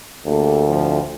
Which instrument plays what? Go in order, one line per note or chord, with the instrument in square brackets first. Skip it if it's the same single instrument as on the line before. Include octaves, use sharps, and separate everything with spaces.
[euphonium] D2 [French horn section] A#3 G4 A4
[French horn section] F2 A2 F3